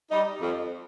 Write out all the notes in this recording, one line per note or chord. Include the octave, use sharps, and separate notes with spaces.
G3 D#4
F2